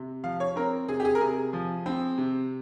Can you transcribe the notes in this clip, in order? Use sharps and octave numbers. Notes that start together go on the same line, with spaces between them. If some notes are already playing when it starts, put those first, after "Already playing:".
Already playing: C3
F3 F5
C#5
C4 A#4
C3 G#4
G4
G#4
A#4
C3 G#4
F3
C4
C3